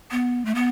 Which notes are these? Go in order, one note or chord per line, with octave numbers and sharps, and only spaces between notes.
B3
A3
B3